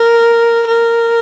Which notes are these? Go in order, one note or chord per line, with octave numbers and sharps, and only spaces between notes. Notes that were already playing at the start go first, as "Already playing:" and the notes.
Already playing: A#4
A#4